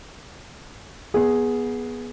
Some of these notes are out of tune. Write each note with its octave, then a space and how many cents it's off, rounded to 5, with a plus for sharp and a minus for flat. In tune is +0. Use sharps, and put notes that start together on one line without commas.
B3 -20 G#4 +0